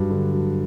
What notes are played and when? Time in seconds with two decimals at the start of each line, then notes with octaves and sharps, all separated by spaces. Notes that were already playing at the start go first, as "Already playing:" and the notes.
Already playing: G2 F#3
0.10 D3
0.32 F#3